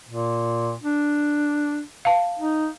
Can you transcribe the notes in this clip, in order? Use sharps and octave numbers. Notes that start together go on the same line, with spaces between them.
A#2
D4
F5 A5
D#4